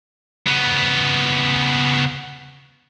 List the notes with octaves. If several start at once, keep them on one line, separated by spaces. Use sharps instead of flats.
C#3 B3